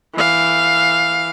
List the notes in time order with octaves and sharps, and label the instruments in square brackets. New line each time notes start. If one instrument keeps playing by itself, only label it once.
[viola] E3 F5